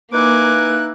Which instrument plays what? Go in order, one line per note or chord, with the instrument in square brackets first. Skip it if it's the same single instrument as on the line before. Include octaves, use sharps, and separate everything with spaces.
[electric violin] A#3 [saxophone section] D#4 E4 B4 [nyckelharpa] G#5 D6 [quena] F#6